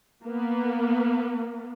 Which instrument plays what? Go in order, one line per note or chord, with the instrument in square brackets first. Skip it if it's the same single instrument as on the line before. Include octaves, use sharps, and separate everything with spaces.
[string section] A#3 B3